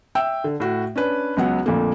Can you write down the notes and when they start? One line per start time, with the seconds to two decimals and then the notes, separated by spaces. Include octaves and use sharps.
0.15 E5 G5 E6
0.44 D3
0.60 A2 F#4
0.96 C#4 D4 B4
1.37 C#2 F#3 B3 F#5
1.66 F2 A#2 D3 A3 A#3